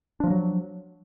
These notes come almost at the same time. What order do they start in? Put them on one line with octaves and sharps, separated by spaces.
D4 F3 A#3 F#3